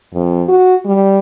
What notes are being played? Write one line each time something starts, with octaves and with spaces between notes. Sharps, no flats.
F2
F#4
G3